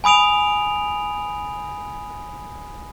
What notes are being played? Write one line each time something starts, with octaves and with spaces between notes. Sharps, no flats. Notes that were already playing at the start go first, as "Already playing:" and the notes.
G#5 B5 D#6 D7 F7